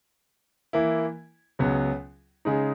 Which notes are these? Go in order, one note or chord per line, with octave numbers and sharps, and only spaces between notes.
E3 A#3 E4
C#2 C#3 F#3 B3
C#3 G#3 D#4